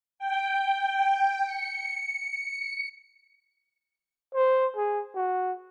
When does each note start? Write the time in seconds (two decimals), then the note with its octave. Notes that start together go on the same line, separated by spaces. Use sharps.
0.19 G5
1.46 C#7
4.34 C5
4.77 G#4
5.15 F#4